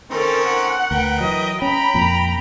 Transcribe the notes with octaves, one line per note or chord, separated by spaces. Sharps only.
D#3 C4 C#4 D#4 A4
F#5
D2 A#4 B4 G5
E3 F#3 D#5
C#4 G5 A#5 B5
F2 A#2